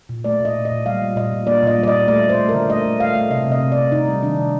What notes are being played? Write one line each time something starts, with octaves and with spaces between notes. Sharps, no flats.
A#2
A3 D5
A#2
D#5
A#2
D#5
A#2
G3 F5
G3
A#2 D#5
A#2
A#3 D5
A#2 D#5
G3
D5
A#2 D#5
A3 D5
A3
C5
A3
A#4
D3
A3 D#5
A3
A3 F5
A3
C3 D#5
C3 D#5
C3
C3 D5
C3 D#4
G3
D#3 D4
C3